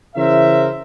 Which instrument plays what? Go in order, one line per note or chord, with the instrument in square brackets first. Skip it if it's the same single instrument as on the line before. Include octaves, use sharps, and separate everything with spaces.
[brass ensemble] C#3 E3 A#4 C5 E5